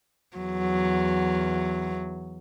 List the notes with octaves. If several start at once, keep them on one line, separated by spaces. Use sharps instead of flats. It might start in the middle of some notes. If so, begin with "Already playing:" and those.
E2 F#3